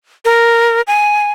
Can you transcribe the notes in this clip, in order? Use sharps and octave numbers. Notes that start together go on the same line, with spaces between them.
A#4
G#5